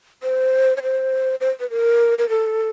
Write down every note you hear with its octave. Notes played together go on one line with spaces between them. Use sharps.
C5
C#5
C5
C5
B4
A#4
A#4
A4